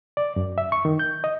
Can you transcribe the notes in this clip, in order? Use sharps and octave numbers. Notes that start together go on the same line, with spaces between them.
D5
F#2
E5
C#6
D#3
G6
D#5